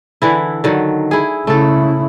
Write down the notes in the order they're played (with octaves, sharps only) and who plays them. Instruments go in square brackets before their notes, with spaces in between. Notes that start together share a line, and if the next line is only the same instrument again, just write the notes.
[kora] D3 E3 E4
D3 D#3 F#3
E4 G#4
[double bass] C#3 E4 [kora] A3 A4